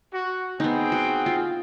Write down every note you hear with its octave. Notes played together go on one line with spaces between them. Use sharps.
F#4
B3 C4 D#4 G#4 G5
F#4
F4